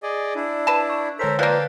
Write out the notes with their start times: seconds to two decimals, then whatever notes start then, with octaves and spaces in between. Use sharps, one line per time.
0.03 G#4 D5 D#5
0.35 D4 E4
0.67 B4 A5
0.90 C#6
1.19 D3 A4 A#4 C5 C#5 B6
1.39 F3 A#3 B4 D5 F5 G5 A5 F#6